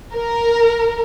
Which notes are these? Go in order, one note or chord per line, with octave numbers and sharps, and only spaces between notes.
A#4